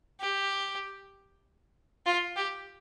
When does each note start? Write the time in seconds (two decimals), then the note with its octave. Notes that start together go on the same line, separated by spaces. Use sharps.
0.21 G4
2.06 F4
2.36 G4